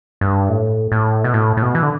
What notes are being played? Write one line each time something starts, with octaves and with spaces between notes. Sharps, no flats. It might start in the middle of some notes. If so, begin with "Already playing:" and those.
G2
A2
A2
B2
A2
A2
B2
E3
D3